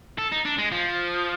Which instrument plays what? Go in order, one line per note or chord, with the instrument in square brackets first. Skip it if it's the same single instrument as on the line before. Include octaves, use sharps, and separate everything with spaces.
[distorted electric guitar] A4
D#4
D4
G#3
F3